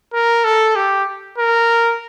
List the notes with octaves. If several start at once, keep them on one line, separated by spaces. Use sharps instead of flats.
A#4
A4
G4
A#4